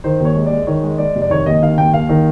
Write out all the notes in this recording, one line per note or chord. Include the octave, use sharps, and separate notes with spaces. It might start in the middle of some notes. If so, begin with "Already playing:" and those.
D#3 C5
D#2
C#5
G#3
D5
G#3
D#3 C#5
G#3
G#3 D5
F1
D5
D#3 C#5
D#2 D#5
D#3 F5
D#2 G5
D#2 F5
D#3